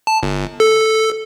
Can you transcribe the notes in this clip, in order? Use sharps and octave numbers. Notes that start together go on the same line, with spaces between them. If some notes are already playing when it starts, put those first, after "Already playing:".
A5
G1
A4